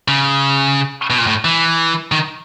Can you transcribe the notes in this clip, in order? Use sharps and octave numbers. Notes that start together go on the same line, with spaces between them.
C#3
B2
A#2
A2
E3
D#3